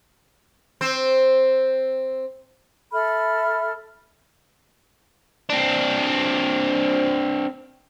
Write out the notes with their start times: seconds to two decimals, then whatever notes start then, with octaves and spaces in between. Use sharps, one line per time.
0.81 C4 C5
2.92 A4 E5 B5 F6
5.50 C4 D4